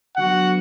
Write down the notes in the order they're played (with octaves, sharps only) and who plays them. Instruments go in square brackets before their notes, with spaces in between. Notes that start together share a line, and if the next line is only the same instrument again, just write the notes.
[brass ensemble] D3 F#3 B3 F#4 F#5